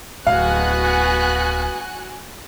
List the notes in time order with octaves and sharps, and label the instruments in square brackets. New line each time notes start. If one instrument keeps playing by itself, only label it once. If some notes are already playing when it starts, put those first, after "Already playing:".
[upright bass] D1 [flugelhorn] B3 [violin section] F#4 G#5 F#6 [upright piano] F5